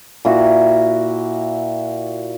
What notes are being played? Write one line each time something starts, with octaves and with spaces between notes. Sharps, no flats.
A#2 E4 F#4